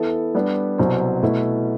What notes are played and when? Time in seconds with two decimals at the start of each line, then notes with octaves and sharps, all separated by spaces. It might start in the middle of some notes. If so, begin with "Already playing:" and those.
Already playing: E3 B3 E4 A4 E5
0.35 G3 B3 D4
0.78 C2 B2 F#3 C4
1.23 B2 A3 E4